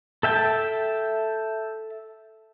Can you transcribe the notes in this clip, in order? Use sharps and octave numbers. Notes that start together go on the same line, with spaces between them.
A4 E5 G5 A5